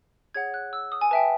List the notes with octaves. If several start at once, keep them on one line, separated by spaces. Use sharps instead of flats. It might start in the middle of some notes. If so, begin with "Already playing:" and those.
G#4 C#5 F#5 G#6
F#6
E6
D#6
G#5
B4 E5 G5 A5